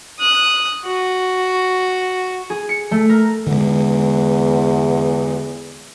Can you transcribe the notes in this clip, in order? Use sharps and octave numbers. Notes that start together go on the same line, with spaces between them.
D#6 F#6
F#4
G#4
C#7
A3
A#4
E2 D3 G#3